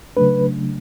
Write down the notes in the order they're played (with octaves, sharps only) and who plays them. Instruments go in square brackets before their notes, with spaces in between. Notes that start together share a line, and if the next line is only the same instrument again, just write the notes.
[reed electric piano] C#3 F#3 A3 D4 B4